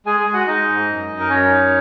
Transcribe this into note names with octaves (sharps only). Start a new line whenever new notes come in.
G#3 G#4 G#5
G#4 G#5
G#3
F#4 F#5
G#3 D#4 D#5
G#2
F#2
F#2
A#4
F#2 C#4 C#5
D#4